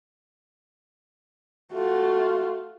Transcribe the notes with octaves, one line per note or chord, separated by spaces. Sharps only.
A3 F4 F#4